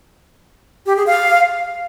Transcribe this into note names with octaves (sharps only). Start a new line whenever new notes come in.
G4
G#4
F5